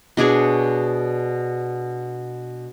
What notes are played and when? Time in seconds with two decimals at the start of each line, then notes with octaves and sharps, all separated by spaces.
0.17 B2 D4 G#4 C#5